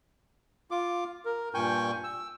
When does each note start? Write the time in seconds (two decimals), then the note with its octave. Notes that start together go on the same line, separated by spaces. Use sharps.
0.71 F4 D6
1.25 A#4
1.54 G2 A#2 G5 G#5 C#6 G6
2.04 E6